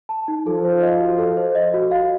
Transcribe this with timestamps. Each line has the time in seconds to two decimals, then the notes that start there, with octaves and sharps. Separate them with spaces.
0.09 A5
0.28 D#4
0.46 F3 F4 A4
0.64 C5
0.82 D#5
1.00 F#4
1.18 A4
1.37 C5
1.55 D#5
1.74 F#4
1.91 F5